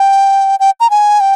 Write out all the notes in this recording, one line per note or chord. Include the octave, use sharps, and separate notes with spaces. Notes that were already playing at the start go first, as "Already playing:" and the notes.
Already playing: G5
G5
A#5
G#5
G5